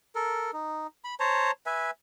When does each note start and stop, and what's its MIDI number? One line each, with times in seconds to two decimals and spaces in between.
0.15 0.51 69
0.15 0.51 70
0.53 0.87 63
1.04 1.15 83
1.20 1.51 72
1.20 1.51 73
1.20 1.51 81
1.20 1.51 82
1.66 1.91 71
1.66 1.91 76
1.66 1.91 80